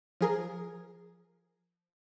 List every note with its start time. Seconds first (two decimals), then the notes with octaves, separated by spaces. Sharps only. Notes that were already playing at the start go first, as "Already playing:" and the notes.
0.21 F3 G#4 A#4